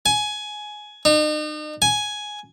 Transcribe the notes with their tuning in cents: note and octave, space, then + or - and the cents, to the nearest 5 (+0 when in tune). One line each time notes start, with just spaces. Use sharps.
G#5 +15
D#4 -40
G#5 +5